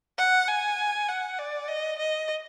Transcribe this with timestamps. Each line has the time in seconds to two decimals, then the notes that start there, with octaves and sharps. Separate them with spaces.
0.18 F#5
0.48 G#5
1.09 F#5
1.39 D5
1.69 D#5
1.99 D#5